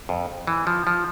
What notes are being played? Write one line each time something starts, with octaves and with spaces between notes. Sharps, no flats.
F2
E3
F3
F3